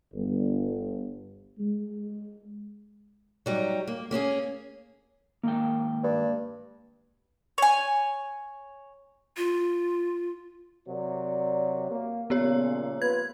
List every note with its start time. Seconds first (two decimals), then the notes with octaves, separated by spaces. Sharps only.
0.14 G1
1.59 G#3
3.46 F#3 G3 D#4
3.87 A#3
4.11 A#3 C#4 F#4 G#4
5.43 D#2 G#2 A#3 G5
6.04 G2
7.58 C#5 G#5
9.37 F4
10.88 C3 F#3 A#4 D5
11.90 A#3
12.30 A#2 C#3 F3 G#3 A#3 B3 G4 C#5
13.02 B3 F4 B4 G#6